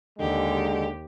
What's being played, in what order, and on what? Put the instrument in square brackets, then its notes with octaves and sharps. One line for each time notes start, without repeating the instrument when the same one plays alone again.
[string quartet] D#2 G4 [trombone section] D3 G#3